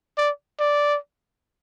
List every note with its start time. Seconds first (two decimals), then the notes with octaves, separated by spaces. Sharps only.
0.18 D5
0.60 D5